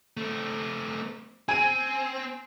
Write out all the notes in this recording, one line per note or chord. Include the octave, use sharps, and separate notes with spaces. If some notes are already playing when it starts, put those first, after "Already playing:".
A3 C4
C4 G#5 D#7